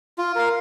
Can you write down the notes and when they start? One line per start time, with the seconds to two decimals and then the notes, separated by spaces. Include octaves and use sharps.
0.18 F4
0.35 A#4 F5